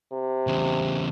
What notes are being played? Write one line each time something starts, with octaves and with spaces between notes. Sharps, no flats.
C3
E2 C#3